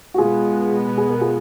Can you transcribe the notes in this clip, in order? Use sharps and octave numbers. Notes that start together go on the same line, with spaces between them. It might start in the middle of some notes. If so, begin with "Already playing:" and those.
F#4
B2 G#3 B3 F4 G#4
G#4
A#4
F4 G#4